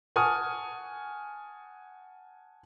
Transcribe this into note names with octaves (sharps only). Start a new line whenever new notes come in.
F#5 G#5 A5 C#6 D#6 F6